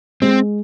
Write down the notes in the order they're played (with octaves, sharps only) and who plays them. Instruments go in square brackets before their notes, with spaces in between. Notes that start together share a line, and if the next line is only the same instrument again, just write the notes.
[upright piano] G#3 [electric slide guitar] C4